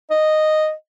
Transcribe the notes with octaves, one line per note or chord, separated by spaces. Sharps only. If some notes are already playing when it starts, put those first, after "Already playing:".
D#5